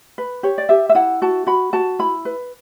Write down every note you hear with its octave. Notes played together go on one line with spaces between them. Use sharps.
B4
G4 C#5
D5
G4 E5
E5
E4 F#5
F#4 A5
F#4 B5
F#4 A5
E4 B5
B4